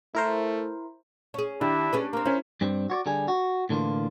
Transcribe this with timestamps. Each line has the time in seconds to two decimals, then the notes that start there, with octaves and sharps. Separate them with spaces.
0.15 A3 E4 A#4 C5
1.34 C#4 G#4
1.61 D#3 D4 E4 G4
1.93 C#4 G#4 B4
2.13 A#3 C4 A#4
2.25 C#4 E4 C5
2.61 G2 G3 C4
2.90 F#4 C#5 D5
3.06 D3 G3 G#4
3.28 F#4
3.69 A2 D3 E3 A#3 F4